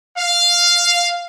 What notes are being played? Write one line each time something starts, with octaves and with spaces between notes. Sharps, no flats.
F5